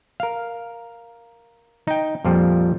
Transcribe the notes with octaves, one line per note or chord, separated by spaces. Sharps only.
A#4 F5
D#4 G5
F2 A#2 F3 G3